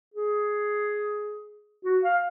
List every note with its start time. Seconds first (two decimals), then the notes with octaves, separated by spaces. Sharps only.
0.14 G#4
1.84 F#4
2.03 F5